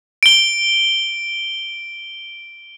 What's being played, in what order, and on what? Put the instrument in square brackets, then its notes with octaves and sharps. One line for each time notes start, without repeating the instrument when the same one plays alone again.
[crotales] D7 G7